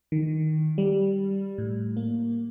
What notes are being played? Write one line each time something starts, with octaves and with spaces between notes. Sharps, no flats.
D#3
G3
A2
A#3